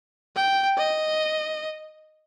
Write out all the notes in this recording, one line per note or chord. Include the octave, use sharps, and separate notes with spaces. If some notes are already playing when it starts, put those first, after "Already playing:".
G5
D#5